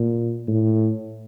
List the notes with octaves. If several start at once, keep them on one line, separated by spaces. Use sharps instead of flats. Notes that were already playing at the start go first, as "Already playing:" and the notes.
Already playing: A#2
A2